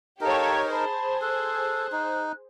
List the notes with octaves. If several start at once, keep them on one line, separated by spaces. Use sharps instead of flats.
D#4 G4 A4 A#4 C#5 F5 A5
G#4 C5 A5 B5
A4 F#6
D#4